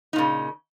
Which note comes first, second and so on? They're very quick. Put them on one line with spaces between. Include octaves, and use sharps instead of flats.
D#4 A#2 C#3